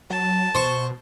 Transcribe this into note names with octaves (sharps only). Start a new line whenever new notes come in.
F#3 A5
B2 C5 C#6